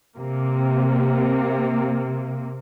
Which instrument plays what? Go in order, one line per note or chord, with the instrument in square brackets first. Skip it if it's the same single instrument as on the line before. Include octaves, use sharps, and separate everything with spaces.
[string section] C3 A#3